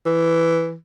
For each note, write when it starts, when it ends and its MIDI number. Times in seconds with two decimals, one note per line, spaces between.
0.06 0.75 52